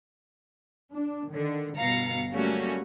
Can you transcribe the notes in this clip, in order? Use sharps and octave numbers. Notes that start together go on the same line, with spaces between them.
D4
D3 D#3
G1 B2 F5 A#5 C#7
F#3 G3 A3 A#3 C#4 F#4